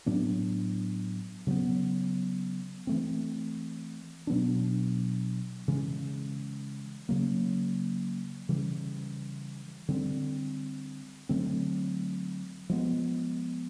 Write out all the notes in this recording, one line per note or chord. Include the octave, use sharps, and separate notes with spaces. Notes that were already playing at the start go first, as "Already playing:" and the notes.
A2 F#3 B3 D4
C#3 F#3 B3
E3 A3 C4
B2 F#3 B3 D4
C#3 E3 G#3
C#3 F#3 A#3
C#3 E3 G3
D3 G3 C4
D3 F#3 A3 C4
F3 G#3 B3